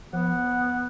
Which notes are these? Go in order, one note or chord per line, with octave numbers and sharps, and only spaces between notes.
F3 B3 F#5